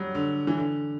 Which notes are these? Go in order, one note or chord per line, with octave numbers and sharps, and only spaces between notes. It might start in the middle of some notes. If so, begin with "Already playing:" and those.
Already playing: F#3 G3
D3
E3
D3